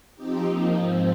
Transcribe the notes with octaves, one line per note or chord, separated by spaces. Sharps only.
F3 C4 D#4 G4
F3 A#3 D#4
G#2 F3 C4